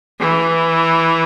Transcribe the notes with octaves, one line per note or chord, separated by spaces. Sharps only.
E3